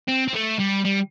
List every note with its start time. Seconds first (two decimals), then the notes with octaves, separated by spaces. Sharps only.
0.08 C4
0.28 C4
0.34 A3
0.59 G3
0.85 G3